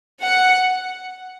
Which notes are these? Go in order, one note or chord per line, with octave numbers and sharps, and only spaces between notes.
F#5